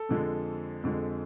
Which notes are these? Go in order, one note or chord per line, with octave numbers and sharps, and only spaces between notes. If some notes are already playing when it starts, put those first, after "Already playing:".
Already playing: A4
F2 D3 F3 G#3
F2 D3 F3 G#3